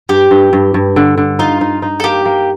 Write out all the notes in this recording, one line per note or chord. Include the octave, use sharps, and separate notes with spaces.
G2 G4
G2
G2
G2
D3
D3
D#4 F4
D#4
D#4
A4
A#3 G4
A#3